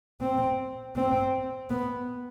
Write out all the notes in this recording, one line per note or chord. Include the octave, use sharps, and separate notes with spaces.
C4
C4
B3